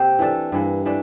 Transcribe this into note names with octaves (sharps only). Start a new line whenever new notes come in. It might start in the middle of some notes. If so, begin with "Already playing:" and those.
Already playing: C3 A#3 C4 G4
E3 A3 D4 A4
G2 E3 A#3
E3 A3 D4